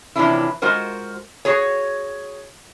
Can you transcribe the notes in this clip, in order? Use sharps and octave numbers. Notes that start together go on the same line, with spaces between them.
C3 E3 F3 C#4 D4 E4
G#3 F4 F#4 A#4 C5
F#4 G#4 C#5